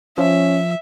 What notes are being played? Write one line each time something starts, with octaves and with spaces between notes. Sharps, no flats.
F3 C#4 E5